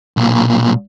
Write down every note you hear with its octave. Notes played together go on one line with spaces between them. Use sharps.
B1 A#2